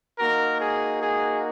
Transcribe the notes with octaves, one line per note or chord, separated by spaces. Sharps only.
A#3 D#4 F#4 A#4
G#4
G#4